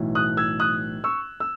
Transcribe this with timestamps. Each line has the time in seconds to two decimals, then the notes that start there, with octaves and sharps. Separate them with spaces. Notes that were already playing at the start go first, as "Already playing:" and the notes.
Already playing: B1 A2 E3
0.15 D#6 F#6
0.37 E6 G#6
0.60 D#6 F#6
1.04 C#6 E6
1.40 E6